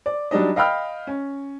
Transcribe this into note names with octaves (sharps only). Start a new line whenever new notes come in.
D5
F#3 G3 D4 D#4 D#5
D#5 F5 G5 B5 F6
C#4